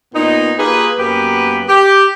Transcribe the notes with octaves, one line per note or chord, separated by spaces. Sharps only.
A#2 B3 D#4
A#3 F4 G4 G#4 B4
F#2 A#3 B3 G4 B4
G4